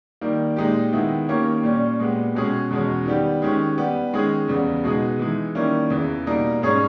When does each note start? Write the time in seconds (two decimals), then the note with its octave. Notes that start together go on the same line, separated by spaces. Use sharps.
0.21 D#3 G3 A#3
0.56 A#2 G#3 D#4 G4
0.93 D#3 G#3 B3 E4
1.28 D#3 A#3 C#4 G4 C#5
1.63 A#2 G3 C#4
1.99 A#2 G#3 B3 G4
2.35 B2 G#3 C#4 G#4
2.71 E2 B2 G#3 C#4
3.05 D#3 G3 B3 G4
3.42 D#3 G#3 C#4 G4
3.78 G3 B3 G4
4.13 D#3 G#3 C#4 G#4
4.48 E2 C#3 G3 B3
4.84 B2 G#3 B3 D#4 G#4
5.19 E3 G#3 D#4
5.55 D#3 G3 A#3 C#4 E4
5.90 E2 C#3 E3
6.26 B2 G3 A#3 D#4 A#4
6.62 G#2 G3 C#4 G#4 C#5